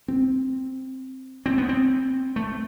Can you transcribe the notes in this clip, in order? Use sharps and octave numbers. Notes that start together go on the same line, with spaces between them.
C4
C4
B3
C4
A3